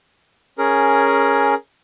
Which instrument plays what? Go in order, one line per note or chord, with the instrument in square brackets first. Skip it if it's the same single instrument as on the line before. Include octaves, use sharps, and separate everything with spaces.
[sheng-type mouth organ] C#4 G#4 A#4